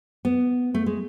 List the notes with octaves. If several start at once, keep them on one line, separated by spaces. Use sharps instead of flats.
B3
A3
G#3